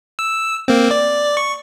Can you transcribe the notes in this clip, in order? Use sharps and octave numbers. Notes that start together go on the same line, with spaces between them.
E6
A#3 C4
D5
C#6